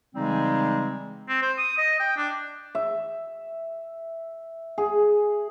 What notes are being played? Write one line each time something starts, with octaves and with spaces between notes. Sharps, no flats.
C#3 E3 G3 G#3 C4 D#4
C4
C5
D#6
D#5
G5
D4
E5
G#4